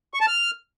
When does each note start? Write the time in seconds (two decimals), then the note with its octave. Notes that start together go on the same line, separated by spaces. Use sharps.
0.14 C#6
0.21 A5
0.27 F6